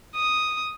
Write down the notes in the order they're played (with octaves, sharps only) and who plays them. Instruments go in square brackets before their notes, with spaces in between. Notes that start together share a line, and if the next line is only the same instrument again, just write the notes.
[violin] D#6